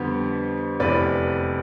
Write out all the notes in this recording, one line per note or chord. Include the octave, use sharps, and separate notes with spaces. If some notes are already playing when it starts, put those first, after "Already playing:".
Already playing: F2 D3 G3 B3 G4
F1 E2 C3 B4 D5